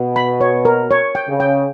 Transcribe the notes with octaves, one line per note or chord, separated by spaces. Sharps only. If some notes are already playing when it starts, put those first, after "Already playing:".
Already playing: B2
B5
C#5
A#4
C#5
G5
C#3
G5